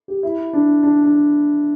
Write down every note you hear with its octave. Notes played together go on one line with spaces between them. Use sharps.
G4
E4
D4
D4
D4